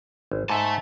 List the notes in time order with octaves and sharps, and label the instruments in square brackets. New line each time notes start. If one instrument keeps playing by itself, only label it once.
[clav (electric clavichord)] G#1
[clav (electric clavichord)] G#2 [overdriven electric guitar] E5 A5